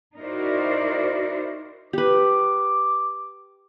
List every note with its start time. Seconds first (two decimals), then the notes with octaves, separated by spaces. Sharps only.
0.18 D#4 E4 F#4 A#4 C5 D5
1.93 G4 B4 D6